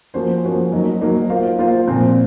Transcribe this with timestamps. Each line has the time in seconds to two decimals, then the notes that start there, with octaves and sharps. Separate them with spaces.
0.14 F3 A#3 C#4 F#4 C5
0.43 F3 A#3 C#4 F#4 C5
0.72 F#3 A#3 D#4
1.01 F#3 A#3 D#4
1.30 A#3 F4 C5 F5
1.59 A#3 F4 C5 F5
1.87 A#2 F3 C4